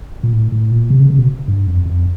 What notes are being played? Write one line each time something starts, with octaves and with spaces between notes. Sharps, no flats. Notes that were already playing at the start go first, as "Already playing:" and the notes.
A#2
A2
A2
A#2
C3
C#3
C#3
B2
G2
F2
F2